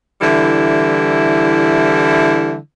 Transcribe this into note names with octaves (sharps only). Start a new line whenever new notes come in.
D3 E3 G3 E4